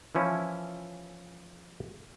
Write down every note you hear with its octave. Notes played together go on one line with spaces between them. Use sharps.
E3 F3 C#4 E4